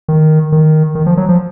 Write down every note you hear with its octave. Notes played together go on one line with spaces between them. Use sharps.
D#3
D#3
D#3
F3
F#3
F3